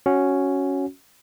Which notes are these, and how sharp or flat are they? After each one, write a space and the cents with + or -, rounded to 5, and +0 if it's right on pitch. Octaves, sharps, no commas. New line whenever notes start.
C#4 +0 F#4 +0